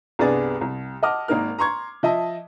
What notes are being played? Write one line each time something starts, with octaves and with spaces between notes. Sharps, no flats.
C2 G2 B3 G#4 D5 A6
C2
D#5 F#5 A5 D6 F6
G#1 A#3 D#4 A#4 F6
A#5 C6 C#6 G#6
F3 D#5 E5 A5